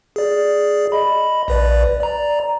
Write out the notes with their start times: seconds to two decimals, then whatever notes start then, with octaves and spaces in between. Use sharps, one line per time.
0.16 G#4 D5
0.92 D#5 B5
1.48 A#1 B4 D5
2.00 D5 A#5